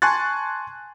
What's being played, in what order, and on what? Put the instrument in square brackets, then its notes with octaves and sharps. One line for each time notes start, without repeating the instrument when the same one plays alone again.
[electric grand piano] G#5 A5 C6 C#6 F#6 A6